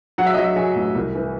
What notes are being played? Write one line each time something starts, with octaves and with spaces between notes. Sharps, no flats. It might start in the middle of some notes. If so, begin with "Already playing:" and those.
F#3 F#5
E5
F#3 D#5
E5
F#3 G#5
A1
C2
E3